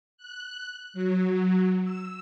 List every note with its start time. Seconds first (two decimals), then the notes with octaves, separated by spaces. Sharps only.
0.17 F#6
0.93 F#3
1.83 E6